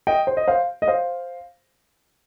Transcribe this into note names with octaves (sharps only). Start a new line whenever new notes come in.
D#5 G5
C5
D#5
C5 F5
D#5
C5 F5